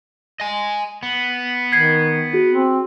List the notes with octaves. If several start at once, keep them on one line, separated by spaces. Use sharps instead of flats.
D#5 G#5
B3
D#3 G#6 C7
F#4 G#4
C4